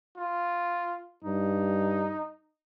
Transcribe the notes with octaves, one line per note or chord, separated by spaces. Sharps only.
F4
G2 D#4